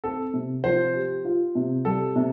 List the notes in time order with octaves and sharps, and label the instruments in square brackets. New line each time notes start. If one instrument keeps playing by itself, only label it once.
[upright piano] C4 [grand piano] A4
[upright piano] C3
[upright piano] F3 [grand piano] C5
[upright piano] G4
F4
C3
[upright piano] G3 [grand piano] A4
[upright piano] C3